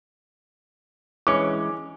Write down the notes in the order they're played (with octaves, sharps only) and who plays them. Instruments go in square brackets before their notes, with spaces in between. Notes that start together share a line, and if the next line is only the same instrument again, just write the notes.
[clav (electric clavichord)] E3 G#3 C#4 [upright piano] D6